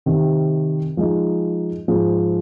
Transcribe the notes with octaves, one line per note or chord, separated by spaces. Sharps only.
C3 D#3 C4
F3 G#3 D#4
G#2 F3 G#3